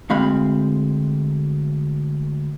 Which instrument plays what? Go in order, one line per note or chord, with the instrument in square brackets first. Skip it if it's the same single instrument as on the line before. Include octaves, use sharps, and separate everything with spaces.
[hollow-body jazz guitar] D2 G#3 C4 F5 B5